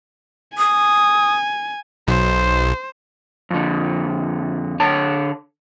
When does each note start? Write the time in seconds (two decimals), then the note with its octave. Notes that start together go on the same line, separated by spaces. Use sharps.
0.58 G#5 D#6
2.08 B1 C5
3.50 F2 D3
4.80 D3 C#5 A5